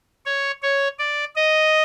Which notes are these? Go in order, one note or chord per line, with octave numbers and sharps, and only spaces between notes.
C#5
C#5
D5
D#5